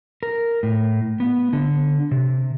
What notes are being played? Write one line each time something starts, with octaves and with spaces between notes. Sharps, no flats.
A#4
A2
B3
D3
C3